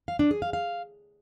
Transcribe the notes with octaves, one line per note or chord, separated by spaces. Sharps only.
F5
D4
G#4
F5
F5